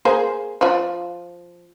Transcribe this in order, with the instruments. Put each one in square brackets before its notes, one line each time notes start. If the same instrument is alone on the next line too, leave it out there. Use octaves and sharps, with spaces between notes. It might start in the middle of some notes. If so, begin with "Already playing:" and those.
[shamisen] A#3 G#4 C5
F3 F4